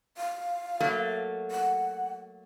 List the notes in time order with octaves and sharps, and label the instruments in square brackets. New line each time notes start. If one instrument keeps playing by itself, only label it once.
[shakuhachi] F5
[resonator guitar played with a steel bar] F#3 A3 A#3
[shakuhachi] F#5